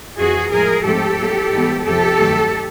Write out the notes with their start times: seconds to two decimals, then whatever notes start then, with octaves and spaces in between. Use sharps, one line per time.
0.18 F2 C3 E3 F#4 G#4
0.51 A2 F3 G#3 G#4 A#4
0.85 G#2 F3 A3 C4 G4 A4
1.18 A2 F#3 A#3
1.52 G#2 E3 G3 B3
1.84 F2 C3 F3 G4 A4
2.18 G2 D#3 F#3 A3